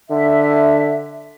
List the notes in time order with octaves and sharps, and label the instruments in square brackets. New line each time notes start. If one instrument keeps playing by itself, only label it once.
[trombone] D3 [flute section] E5